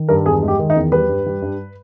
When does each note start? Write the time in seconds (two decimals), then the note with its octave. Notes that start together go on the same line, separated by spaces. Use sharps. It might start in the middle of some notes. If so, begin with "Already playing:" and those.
Already playing: D#3
0.09 G2 A#4
0.26 E2 G#4
0.43 G#3
0.48 G4
0.59 D#3
0.70 D#4
0.76 E2
0.92 G3 B4
1.09 G2
1.26 G3
1.42 G2